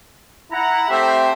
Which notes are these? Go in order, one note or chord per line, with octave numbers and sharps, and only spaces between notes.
E4 F#5 A#5
A3 C4 G4 C5 E5